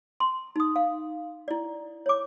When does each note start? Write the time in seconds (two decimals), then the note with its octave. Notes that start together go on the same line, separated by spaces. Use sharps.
0.20 C6
0.56 D#4 D#6
0.76 F5
1.48 E4 D5
2.06 C#5 D6